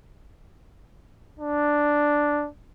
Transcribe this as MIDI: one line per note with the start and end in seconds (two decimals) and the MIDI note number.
1.40 2.48 62